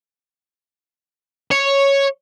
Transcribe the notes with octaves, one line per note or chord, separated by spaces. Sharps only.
C#5